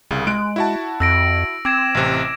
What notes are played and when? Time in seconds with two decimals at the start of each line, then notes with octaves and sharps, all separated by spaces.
0.11 C2 C#3
0.27 G#3 F#6 D7
0.56 E4 F#4 A5
1.00 F2 E6 A#6 D7
1.65 C4 D6 G#6 E7
1.95 A1 C3